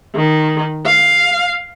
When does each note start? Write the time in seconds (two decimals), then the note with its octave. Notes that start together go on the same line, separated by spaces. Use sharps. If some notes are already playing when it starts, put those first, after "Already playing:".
0.15 D#3
0.86 F5